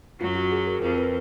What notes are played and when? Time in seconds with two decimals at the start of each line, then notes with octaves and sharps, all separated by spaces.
0.21 F#2 F#3 F4
0.35 F#4
0.52 G#4
0.67 A#4
0.82 F2 F3 A#4
0.98 B4